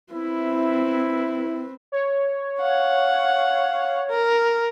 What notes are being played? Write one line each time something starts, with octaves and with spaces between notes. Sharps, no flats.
C4 E4 B4
C#5
F5 F#5
A#4